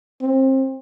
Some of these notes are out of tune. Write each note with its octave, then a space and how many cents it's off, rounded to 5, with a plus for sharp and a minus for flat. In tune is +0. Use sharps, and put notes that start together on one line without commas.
C4 +25